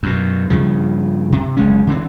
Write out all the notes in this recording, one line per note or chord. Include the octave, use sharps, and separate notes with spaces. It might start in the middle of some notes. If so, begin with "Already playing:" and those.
F#2 B2
G2 C#3 F3
C3
F#1 G#3 C#4
D3 E3 C4